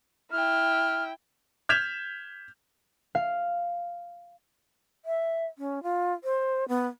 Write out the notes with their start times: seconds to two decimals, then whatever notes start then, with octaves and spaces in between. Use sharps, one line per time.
0.31 E4 G5 F6
1.69 F6 G6 G#6 B6 E7 F7
3.15 F5
5.05 E5
5.58 C#4
5.83 F4
6.24 C5
6.68 B3